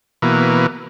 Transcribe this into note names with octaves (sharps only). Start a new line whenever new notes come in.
B2 E3 A#3